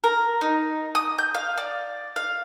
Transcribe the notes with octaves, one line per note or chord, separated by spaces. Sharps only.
A#4
D#4
D#6
G6
F5
D5
F5